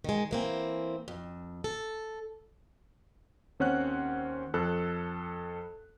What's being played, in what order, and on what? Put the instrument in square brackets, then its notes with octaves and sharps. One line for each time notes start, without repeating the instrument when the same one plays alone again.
[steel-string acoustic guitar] D#3 G#3
E3 A#3 C4
F2
A4
[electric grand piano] D#2 C4 C#4 C#5 F#5 F#6
F2 A4 F#6